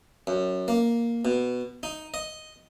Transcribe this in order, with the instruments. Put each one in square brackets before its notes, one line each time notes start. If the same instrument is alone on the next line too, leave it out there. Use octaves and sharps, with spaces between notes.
[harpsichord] F#2
A#3
B2
D#4
D#5